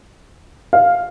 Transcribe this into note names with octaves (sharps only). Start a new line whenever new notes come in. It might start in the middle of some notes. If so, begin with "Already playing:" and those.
F5